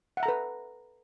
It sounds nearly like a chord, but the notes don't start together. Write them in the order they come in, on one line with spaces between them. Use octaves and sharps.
F#5 E5 A#5 A4 B4